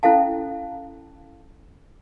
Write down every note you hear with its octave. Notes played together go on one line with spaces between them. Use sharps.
C#4 E4 A4 F5 A5